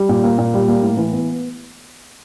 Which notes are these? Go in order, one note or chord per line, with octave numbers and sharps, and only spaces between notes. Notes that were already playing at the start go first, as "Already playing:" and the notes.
Already playing: G3
A#2
A#3
A#2
G3
A#3
A2
E3
B3